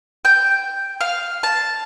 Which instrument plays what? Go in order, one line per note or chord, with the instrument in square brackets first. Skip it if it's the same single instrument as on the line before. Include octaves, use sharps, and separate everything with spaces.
[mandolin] G5
F5
A5